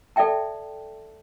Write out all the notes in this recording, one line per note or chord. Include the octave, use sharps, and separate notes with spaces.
A4 D5 E5 G5 A5